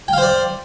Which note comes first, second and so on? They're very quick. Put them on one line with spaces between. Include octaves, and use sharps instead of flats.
G5 F5 C5 D5